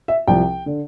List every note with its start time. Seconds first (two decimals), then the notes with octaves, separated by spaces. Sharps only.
0.08 E5
0.27 C2 C3 F3 G5
0.66 D3